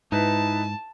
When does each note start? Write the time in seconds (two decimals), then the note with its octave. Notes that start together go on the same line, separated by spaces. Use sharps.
0.12 G#2 D#4 E4 B4 A5